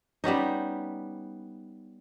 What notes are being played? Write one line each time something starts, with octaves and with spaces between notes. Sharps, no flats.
G3 B3 C#4 D#4